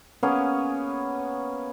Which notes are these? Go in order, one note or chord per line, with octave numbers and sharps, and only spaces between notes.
A#3 B3 C#4 G#4